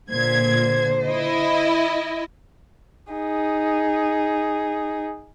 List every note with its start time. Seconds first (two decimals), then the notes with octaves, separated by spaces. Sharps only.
0.11 A#2 D3 C5 G#6
1.05 E4 D#5
3.13 D#4 G#4